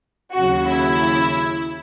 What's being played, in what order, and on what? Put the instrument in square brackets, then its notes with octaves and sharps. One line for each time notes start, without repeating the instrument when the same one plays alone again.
[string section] D#2 C#3 F#3 F#4
E4